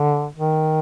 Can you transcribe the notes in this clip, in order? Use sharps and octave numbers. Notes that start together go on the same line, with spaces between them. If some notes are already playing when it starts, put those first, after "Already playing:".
Already playing: D3
D#3